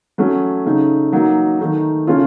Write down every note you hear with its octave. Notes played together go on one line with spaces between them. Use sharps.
F#3 A3 C#4 F#4
C#3 A3 D#4
F#3 A#3 D#4 F#4
D#3 A3 D#4
C#3 A3 C#4 F4